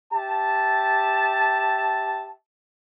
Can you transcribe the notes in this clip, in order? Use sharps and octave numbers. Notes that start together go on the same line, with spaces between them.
G4 E5 A5